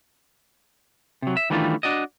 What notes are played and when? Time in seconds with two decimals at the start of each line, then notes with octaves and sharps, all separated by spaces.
1.22 C3 F#3
1.37 E5
1.50 D#3 E3 G3 A3 D4 F4
1.83 D4 F#4 D5 D#5